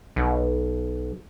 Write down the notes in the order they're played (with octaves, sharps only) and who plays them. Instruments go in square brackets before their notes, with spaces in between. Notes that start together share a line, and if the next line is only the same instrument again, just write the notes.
[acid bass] B1